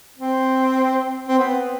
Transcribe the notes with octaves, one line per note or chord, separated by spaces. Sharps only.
C4
C4
B3